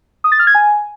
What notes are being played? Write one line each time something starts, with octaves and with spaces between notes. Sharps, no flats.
D#6
A6
F6
G#6
G#5